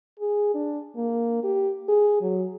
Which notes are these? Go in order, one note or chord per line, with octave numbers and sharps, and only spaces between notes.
G#4
D4
A#3
G4
G#4
F#3